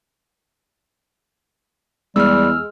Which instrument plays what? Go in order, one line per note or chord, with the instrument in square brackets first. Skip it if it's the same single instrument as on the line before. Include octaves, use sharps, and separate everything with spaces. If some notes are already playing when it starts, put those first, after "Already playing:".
[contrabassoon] E2 [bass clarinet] G3 [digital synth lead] G#3 [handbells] E6 F6